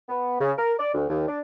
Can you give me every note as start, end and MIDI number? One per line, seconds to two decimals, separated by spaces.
0.09 0.38 59
0.40 0.52 49
0.58 0.73 70
0.79 0.94 74
0.94 1.05 38
1.09 1.23 39
1.28 1.40 62